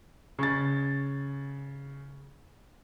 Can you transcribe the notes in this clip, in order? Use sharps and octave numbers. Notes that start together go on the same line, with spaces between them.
C#3 A6